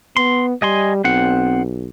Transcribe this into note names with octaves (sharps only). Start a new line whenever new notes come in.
B3 C6
G3 D#5 G#5 C6
B1 C4 F#5